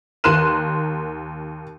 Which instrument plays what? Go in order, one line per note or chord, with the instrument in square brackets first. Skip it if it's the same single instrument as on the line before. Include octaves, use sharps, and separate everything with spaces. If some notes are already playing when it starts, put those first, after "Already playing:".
[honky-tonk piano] D#2 A#4 C6 F#6 D#7 E7